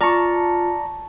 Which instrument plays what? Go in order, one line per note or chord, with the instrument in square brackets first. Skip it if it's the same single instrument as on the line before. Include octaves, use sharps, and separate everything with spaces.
[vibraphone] F4 [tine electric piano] D5 A#5 [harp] A5 C#6